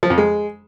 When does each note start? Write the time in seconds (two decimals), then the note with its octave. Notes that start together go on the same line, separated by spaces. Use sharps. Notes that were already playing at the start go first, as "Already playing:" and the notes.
0.03 F3
0.10 F2
0.18 G#3